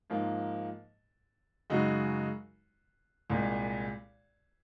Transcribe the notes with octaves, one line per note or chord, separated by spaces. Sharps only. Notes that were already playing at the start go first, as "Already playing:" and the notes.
G#2 F3 A#3
F#2 C#3 G#3 D#4 F#4
C2 A#2 G#3